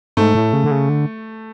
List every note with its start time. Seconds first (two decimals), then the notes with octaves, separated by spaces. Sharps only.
0.17 G#2 A3
0.35 A2
0.53 C#3
0.64 D3
0.71 C#3
0.89 D3